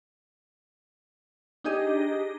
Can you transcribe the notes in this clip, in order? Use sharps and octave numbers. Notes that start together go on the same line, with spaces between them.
D4 D#4 G4 G#4 D#5